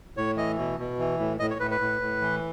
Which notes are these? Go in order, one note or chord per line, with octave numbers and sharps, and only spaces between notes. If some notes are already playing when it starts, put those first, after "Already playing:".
A2 C#5
E3 D#5
B2
B2
E3
A2
A2 D#5
C#5
A2 B4
B4
A2
A2
E3